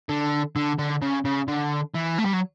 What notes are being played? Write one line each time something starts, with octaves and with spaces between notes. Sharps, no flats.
D3
D3
D3
C#3
C#3
D3
E3
A3
G3
F#3